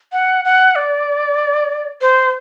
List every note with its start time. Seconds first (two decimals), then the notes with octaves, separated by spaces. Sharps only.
0.13 F#5
0.45 F#5
0.76 D5
2.01 C5